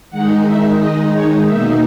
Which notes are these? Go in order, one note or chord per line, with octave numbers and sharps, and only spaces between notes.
D#3 G#3 D#4 F#5
E5
D#5
C#5
B2 A#3 D#4 E5